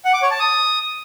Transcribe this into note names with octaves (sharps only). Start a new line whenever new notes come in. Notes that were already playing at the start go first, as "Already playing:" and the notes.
F#5
D6
C#5
A5
D#6